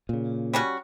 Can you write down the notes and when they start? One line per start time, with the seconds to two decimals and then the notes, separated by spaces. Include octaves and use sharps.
0.09 A#2 C#3
0.53 G3 C#4 F#4